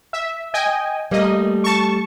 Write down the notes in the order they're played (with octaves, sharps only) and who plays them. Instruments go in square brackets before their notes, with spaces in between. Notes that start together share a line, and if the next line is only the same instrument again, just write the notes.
[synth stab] E5
D#5 G5 G#5
[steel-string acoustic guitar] G3 A3 [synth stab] A#3 D#5
[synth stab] A5 C#6